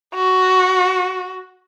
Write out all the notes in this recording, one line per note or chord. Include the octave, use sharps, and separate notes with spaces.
F#4